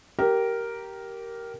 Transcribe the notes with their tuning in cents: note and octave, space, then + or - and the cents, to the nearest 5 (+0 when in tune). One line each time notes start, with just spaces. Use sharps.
G4 -15 A#4 +0